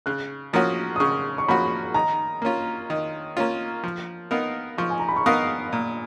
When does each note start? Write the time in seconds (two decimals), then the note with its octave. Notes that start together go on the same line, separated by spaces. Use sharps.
0.06 C#3 F#6
0.53 F3 A#3 C#4 F#4 D#6
0.96 D#6
1.00 C#3 C#6
1.38 C#6
1.48 F3 A#3 C#4 F#4 B5
1.94 D#3 A#5
2.42 A#3 C#4 F4
2.90 D#3
3.37 A#3 C#4 F4
3.83 F3
4.31 B3 D#4 A#4 F5
4.78 F3 C#6
4.90 G#5
4.99 A#5
5.08 B5
5.16 C#6
5.26 B3 D#4 A#4 F5 D#6
5.73 A#2